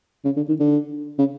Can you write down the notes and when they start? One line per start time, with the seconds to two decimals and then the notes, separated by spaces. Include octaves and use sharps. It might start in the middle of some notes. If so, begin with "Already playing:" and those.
0.25 C#3
0.36 D3
0.48 D#3
0.60 D3
1.19 C#3